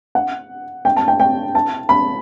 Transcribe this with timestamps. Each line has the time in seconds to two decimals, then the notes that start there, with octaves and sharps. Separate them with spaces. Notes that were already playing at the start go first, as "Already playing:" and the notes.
0.15 F#5
0.85 G5
0.97 A5
1.08 G5
1.20 G5
1.55 A5
1.89 B5